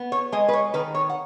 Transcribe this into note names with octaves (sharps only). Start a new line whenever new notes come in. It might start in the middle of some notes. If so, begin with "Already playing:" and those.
Already playing: B3
C#5
G#3 D#5
B4
C#5
D#3 B4
C#5
F#5